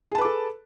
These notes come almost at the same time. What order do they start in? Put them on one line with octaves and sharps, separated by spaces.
G#4 A5 B4 D6 A4